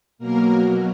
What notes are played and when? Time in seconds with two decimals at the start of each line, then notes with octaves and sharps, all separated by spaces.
0.18 B2 F#3 A#3 A#4